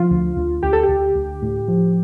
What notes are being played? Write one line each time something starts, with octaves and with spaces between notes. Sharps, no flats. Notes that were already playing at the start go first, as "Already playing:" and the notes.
Already playing: F3 F4
D2
D2
D2 G4
A4
G4
D2
D2
A2
F3